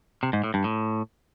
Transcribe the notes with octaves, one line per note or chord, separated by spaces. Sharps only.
C3
G#2
A2
G2
A2